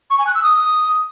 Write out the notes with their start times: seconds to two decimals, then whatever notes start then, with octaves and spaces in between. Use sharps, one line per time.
0.10 C#6
0.18 G#5
0.26 F#6
0.35 E6
0.43 D#6